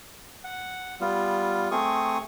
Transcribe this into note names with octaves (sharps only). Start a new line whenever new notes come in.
F#5
G3 B3 F4
A3 C4 G#4 C#6 D#6